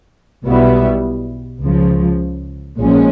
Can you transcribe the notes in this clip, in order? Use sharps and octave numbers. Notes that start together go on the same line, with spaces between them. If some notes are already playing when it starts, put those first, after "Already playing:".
B1 B2 G3 B3 E4
C#2 C#3 F3
A#1 A#2 F3 G#3 C#4